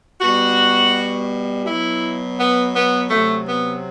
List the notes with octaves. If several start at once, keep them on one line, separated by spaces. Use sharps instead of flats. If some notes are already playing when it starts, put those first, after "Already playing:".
B2 G3 F#4
B2 F#3 E4
B3
B3
C3 F#3 A3
B3